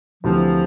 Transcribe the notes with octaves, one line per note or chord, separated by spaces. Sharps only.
D2 C3 E3 F3